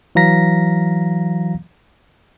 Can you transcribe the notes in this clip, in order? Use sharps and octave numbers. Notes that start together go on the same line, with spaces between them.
E3 F#3 F5 A#5 A#6 B6